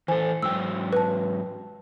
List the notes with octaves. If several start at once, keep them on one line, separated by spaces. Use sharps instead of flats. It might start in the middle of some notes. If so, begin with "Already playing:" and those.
E3 A4 C5 G#5
G#2 F#3 G5 E6
B4 A5